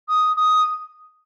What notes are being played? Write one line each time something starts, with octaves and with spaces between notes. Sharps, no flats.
D#6
D#6